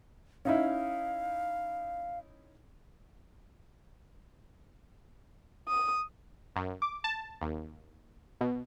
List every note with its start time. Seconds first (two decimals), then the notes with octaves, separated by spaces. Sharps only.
0.45 C#4 D#4 E4 F5
5.69 D#6
6.56 F#2
6.82 D6
7.04 A5
7.41 D#2
8.41 B2